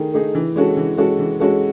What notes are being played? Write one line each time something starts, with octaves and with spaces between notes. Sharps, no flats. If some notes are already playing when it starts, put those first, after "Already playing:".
Already playing: D#3 A3 D#4 G#4
A3 D#4 G#4
E3
G#3 C#4 F#4 A4
E3
G#3 C#4 F#4 A4
E3
G#3 C#4 F#4 A4